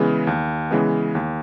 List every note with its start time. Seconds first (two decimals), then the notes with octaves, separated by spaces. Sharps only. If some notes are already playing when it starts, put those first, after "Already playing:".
Already playing: C#3 E3 G#3 B3
0.27 D#2
0.71 C#3 E3 G#3 B3
1.15 D#2